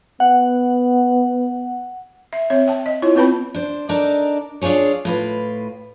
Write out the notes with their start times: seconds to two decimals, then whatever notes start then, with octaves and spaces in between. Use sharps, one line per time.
0.20 B3 F#5
2.33 E5
2.50 C4 C#5 E5
2.68 G5 A5
2.86 D#5
3.02 E4 F4 C#5
3.15 B3 C4 F4 B4 A5 B5
3.54 D4 C5
3.89 D4 D#4 A4 A#4 D5
4.62 D4 F4 G4 G#4 C#5
5.05 A2 F4 B4